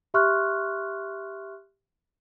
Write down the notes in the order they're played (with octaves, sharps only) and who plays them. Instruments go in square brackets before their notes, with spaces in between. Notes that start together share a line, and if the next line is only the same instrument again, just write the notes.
[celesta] G4 E5 C6 C#6 F6 F#6